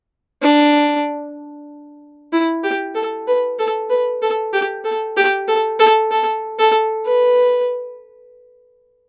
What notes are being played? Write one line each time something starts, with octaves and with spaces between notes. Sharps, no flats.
D4
E4
G4
A4
B4
A4
B4
A4
G4
A4
G4
A4
A4
A4
A4
B4